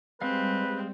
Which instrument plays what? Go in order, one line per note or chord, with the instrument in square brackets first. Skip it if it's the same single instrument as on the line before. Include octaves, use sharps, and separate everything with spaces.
[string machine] G3 [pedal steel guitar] G#3 F5 [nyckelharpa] C4 [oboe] B4